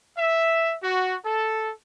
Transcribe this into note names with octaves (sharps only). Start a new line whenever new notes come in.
E5
F#4
A4